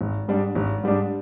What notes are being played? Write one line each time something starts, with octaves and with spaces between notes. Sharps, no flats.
G#1
G#2 G3 D4
G#1
G#2 G3 D4